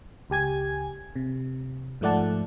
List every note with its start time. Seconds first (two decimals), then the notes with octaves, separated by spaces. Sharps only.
0.30 C#2 G4 G#5 G#6
1.16 C3
2.01 G#2 F3 A3 D5 F#5 A5